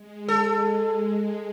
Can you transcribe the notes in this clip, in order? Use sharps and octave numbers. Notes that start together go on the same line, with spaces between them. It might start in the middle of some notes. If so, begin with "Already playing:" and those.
Already playing: G#3
A4